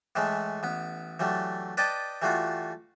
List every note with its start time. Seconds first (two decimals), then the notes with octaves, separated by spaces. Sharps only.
0.16 A2 E3 G#3 A3
0.63 A1 B3
1.20 E3 F#3 G3 A3
1.77 B4 D5 D#5 G5 A5
2.22 E3 G3 A3 F4 F#4